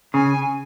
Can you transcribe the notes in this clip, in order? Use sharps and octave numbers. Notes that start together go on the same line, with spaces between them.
C#3 G#5